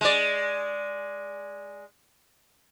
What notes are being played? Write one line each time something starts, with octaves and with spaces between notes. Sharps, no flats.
G#3 D5